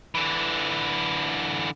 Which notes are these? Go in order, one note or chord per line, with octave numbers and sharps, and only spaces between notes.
D3 E3